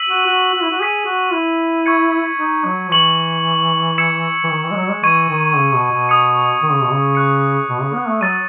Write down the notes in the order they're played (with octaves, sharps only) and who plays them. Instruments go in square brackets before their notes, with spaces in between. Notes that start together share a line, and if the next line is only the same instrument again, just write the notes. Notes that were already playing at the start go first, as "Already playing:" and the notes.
Already playing: [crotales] E6 B6 D#7 F#7
[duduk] F#4
F#4
F#4
E4
F#4
[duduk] G#4 [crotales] E6 B6 D#7
[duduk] F#4
E4
[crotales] C#6 G#6 C#7
[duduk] D#4
F#3
[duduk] E3 [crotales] C#6 G#6 C#7 F#7
[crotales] E6 G#6 C#7 E7
[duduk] E3
D#3
E3
G#3
F#3
G#3
[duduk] E3 [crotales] C#6 G#6 D#7
[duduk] D#3
C#3
B2
B2
[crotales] D#6 G#6 C#7
[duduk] D#3
C#3
B2
C#3
[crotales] C#6 F#6 C#7
[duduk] B2
C#3
B3
A3
[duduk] F#3 [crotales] E6 A6 D#7